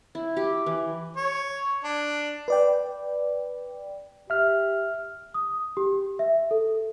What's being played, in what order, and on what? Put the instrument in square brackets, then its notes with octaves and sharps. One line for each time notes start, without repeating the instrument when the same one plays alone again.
[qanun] E4
G4
E3
[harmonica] C#5
D4
[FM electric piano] B4 D5 G5
[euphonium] G4 [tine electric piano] E5 F6
[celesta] D#6
G4
E5
A4